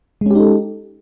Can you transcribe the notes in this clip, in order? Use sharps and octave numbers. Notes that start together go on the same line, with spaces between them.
G#3 C#4 D#4 G4 A4